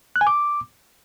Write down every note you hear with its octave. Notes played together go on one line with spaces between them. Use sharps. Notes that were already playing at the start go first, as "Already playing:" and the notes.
F#6
G#5
D6